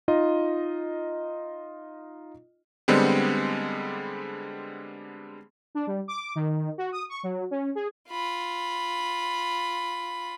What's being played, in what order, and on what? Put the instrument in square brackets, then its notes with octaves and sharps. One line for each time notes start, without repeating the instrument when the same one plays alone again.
[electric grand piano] D#4 F4 D#5
D3 G3 G#3 B3 C4
[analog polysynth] D4
G3
D6
D#3
F#4
D#6
C#6
F#3
C#4
G#4
[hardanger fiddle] F4 B5